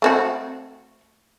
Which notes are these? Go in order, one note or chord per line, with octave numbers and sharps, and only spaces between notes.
A3 C4 F#4